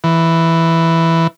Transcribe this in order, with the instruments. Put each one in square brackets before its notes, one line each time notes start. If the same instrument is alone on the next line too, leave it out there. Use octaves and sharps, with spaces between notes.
[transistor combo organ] E3